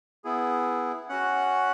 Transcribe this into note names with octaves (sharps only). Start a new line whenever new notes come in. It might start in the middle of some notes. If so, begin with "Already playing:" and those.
B3 E4 G#4
C#4 F#4 F#5